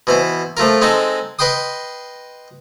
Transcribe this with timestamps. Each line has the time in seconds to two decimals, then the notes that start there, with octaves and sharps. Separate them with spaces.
0.07 B2 E3 C5
0.57 F3 A3 F4 A#4
0.82 G#3 C4 D#4 A4
1.39 B4 D#5 G5 C6 D#6